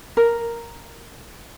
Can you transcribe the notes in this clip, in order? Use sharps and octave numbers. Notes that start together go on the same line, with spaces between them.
A#4